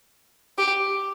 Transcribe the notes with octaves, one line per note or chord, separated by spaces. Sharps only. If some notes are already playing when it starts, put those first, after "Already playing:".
G4